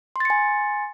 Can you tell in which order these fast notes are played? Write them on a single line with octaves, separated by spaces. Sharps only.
C6 A6 C#7 G#5